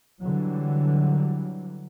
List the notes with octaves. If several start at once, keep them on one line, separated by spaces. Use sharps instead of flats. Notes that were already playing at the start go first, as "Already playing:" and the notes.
D3 E3 F#3 G3